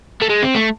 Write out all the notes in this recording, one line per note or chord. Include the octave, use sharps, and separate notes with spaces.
A3
G#3
C4
A3